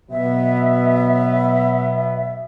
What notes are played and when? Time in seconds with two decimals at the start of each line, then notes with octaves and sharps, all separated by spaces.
0.10 B2 F#3 B3 E5